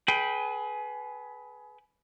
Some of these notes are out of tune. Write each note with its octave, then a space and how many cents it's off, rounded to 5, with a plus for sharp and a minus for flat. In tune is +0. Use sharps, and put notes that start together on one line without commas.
G#4 +30 B4 +0 G5 +0